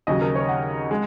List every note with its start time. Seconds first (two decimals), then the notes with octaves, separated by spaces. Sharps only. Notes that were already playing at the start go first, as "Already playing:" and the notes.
0.07 D#2 C#3 F#3 D#5
0.21 A#4
0.35 C#5
0.49 F#5
0.91 G#3